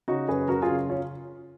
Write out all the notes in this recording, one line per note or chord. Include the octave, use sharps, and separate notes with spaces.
C#3 D#4 F#4
F#2 G#4 B4
F#2 F#4 A#4
F4 G#4
C#3
C#4 F4